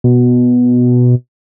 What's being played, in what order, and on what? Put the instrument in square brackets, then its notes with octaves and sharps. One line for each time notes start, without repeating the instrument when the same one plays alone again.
[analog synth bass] B2